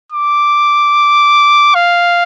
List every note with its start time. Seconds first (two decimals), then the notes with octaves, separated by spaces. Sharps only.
0.12 D6
1.75 F5